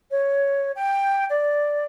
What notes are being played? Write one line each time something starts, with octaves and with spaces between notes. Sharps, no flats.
C#5
G5
D5